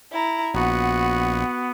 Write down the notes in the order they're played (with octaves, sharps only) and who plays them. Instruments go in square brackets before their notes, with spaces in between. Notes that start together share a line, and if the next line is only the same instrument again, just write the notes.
[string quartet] E4 A#5
[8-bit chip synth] A#1 [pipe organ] B3 [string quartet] F#4